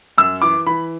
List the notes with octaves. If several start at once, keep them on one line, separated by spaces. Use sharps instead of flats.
F#2 E6
E3 D6
E3 B5